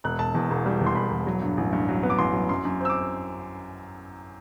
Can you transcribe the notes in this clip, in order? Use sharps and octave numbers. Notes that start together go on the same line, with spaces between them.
E1 F#6
E1 A5
E2
E1
G3
E2
C6
E1 B5
E1
F#3
G2
A1
G2
F#3
B3
D6
A1 C6
F#3
F#2 C6
F#2
C4 E6
D6